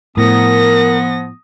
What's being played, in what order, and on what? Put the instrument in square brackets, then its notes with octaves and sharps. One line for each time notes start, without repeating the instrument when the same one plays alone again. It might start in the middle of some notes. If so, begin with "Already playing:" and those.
[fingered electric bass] A2 [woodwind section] F3 B3 [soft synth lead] A#4 [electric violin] D#6 A#6